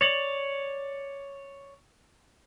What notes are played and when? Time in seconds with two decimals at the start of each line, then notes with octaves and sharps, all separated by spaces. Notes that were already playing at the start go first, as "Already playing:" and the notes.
0.01 C#5 D5